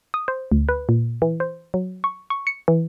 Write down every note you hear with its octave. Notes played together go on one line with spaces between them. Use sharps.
D#6
C5
D2
B4
A#2
E3
C5
F#3
C#6
C#6
C#7
E3